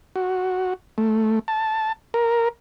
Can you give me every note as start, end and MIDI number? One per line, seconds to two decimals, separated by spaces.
0.16 0.74 66
0.98 1.39 57
1.48 1.92 81
2.14 2.48 70